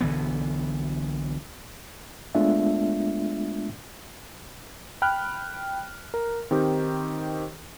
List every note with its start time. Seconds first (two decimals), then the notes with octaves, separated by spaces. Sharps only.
0.01 B1 D3 E3 B3
2.35 G#3 A3 B3 D4 F4 E5
5.02 G5 B5 F6 F#6
6.14 A#4
6.51 D#3 C4 D#4 G4